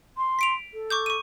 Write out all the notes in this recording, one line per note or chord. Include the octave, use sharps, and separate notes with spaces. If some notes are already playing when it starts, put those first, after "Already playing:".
C6
B6 D7 F7
A4
C#6 D6 G6
C#6 D#7